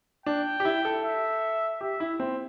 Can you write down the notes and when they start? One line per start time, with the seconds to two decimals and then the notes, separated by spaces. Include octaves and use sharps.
0.26 D4 G5
0.60 G4
0.65 E4
0.85 A4
1.04 E5
1.81 G4 E5
2.00 E4
2.20 C4